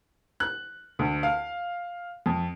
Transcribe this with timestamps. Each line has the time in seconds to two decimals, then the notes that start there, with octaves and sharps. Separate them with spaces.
0.40 F#6
0.99 D2
1.23 F5
2.26 F2